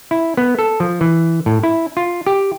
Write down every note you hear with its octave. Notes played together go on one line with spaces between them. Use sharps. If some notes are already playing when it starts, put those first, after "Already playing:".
E4
B3
A4
F3
E3
A2
E4
F4
G4